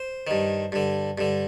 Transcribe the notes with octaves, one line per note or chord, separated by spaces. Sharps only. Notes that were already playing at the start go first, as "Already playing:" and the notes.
Already playing: C5
G2 D#3
G2 D3
G2 D3